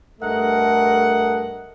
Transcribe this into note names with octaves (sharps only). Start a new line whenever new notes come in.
G2 A3 A4 A#4 D#5 F#5